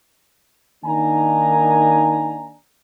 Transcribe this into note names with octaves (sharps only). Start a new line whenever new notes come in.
D#3 A#3 D4 D#4 G#5 A#5